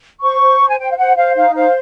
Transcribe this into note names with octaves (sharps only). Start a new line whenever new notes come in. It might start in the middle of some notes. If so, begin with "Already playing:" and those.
C5 C#6
C5
C5
G#5
C5 G5
F5
C5 F#5
C5 F5
D#4 F5
C5 F5